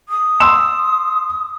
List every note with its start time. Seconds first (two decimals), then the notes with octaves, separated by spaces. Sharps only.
0.09 D#6
0.40 C6 E6 E7